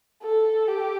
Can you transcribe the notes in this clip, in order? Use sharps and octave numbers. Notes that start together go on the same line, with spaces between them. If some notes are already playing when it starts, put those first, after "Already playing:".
A4
G4